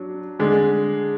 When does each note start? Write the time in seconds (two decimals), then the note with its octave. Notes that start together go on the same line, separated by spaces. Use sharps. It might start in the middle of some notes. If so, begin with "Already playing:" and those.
Already playing: F#3 D4
0.39 D3 G#3 D4